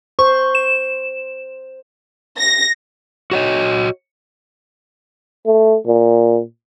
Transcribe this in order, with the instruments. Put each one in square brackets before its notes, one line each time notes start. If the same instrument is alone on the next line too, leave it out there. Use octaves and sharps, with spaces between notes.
[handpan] C5 [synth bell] C#6
[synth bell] E7
[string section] A#6
[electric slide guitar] F#4 C#5 D#5
[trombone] A3
A#2